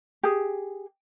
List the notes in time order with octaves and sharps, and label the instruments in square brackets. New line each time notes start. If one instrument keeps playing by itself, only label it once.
[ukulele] G4 G#4